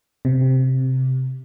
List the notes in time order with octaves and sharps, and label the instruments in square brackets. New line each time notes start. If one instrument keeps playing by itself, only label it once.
[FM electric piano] C3